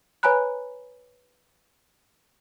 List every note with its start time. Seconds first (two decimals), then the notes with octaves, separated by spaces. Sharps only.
0.23 B4 C#5 G#5 A#5 B5 F#6